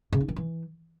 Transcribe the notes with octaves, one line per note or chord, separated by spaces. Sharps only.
C#3
D#4
D#3
E3